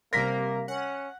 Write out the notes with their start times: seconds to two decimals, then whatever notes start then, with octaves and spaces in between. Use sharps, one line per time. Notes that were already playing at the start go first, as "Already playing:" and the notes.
0.13 C3 G3 A#3 A#4 A#6 B6
0.68 C#4 F#5